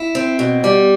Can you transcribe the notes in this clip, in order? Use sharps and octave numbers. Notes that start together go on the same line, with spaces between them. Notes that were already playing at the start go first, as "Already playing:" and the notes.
Already playing: E4
C4
B2
G3